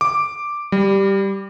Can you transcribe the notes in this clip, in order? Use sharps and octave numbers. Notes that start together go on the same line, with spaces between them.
D6
G3